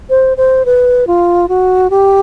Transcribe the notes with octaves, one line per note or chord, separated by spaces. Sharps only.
C5
C5
B4
F4
F#4
G4